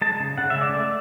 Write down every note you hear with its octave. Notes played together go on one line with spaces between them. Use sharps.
G#3 A5
C#3
C#3 F#5
E5
G#3
D5
A3